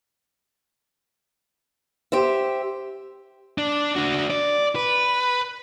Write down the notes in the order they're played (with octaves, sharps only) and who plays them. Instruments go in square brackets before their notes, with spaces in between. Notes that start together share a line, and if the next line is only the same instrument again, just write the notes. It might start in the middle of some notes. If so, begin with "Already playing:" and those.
[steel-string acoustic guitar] G4 C5 E5
[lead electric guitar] D4
D4 F#4
D5
B4